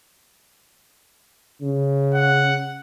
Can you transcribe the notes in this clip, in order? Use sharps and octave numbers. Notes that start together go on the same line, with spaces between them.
C#3
F#5